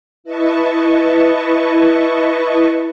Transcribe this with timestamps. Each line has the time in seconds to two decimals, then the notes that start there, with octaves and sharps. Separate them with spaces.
0.24 E4 B4 D#5 A5 C#6